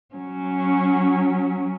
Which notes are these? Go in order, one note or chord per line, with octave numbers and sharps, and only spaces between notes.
F#3 C#4